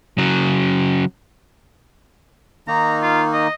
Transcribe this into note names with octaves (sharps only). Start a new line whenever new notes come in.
C#3 F#3
D#3 A#3 D#4 A#5
F4
D#5